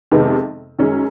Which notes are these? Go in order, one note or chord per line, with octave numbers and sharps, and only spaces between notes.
F2 C3 D#3 G#3 B3
F#2 D#3 G#3 C#4